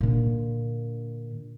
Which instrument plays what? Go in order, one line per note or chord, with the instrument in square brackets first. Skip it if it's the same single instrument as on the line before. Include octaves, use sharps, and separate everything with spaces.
[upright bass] A#2 D3